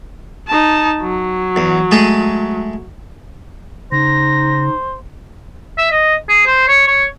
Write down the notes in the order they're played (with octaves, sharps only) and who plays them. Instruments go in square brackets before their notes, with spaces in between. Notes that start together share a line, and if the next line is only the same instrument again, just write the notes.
[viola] D#4 A5
F#3
[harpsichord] E2
G#3 A3 G#4
[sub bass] C#3 [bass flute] D#4 [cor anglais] C5 [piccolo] A#6
[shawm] E5
D#5
G#4
C5
C#5
C#5